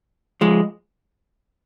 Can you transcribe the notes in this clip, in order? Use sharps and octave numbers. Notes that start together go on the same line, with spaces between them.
F3 G#3